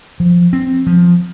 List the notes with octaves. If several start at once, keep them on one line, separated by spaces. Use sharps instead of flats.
F3
C4
F3